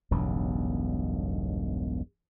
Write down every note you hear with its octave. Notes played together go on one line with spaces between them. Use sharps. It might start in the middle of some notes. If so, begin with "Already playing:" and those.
E1 B1 G2 C#3